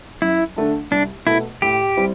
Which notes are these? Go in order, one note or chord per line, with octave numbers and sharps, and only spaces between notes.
F#2 E4
D3 A3 D4
C2 D4
B2 A3 E4
A2 G4
G3 C4 E4